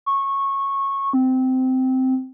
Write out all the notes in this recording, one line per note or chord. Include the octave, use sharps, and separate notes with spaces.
C#6
C4